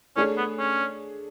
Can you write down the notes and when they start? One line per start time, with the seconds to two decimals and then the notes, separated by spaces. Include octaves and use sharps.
0.16 A3 C#4 D4 G#4 C#5
0.38 B3
0.59 C#4